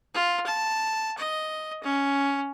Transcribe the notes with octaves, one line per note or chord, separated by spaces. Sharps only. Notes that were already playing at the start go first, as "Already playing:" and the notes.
F4
A5
D#5
C#4